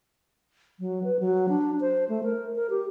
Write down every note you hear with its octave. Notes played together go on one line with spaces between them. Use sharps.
F#3
B4
F#3
D4
C5
A3
A#4
A#4
G4